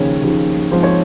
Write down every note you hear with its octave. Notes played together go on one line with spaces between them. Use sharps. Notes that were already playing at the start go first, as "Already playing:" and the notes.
Already playing: D#2 C#3 F3 C#5
D#2 C#3 F3
G#2 F3 C4 C5
C#5